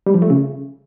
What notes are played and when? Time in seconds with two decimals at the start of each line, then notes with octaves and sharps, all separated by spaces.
0.06 G3
0.14 F3
0.22 A3
0.30 C#3